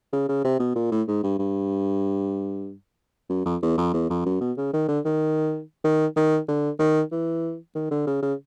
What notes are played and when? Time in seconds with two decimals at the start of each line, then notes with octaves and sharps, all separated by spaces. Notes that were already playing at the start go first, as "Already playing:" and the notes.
0.13 C#3
0.29 C#3
0.45 C3
0.60 B2
0.76 A#2
0.91 A2
1.08 G#2
1.24 G2
1.39 G2
3.30 F#2
3.46 F2
3.62 E2
3.77 F2
3.94 E2
4.10 F2
4.26 F#2
4.41 B2
4.57 C#3
4.73 D#3
4.89 D3
5.05 D#3
5.84 D#3
6.17 D#3
6.48 D3
6.79 D#3
7.12 E3
7.75 D#3
7.91 D3
8.07 C#3
8.22 C#3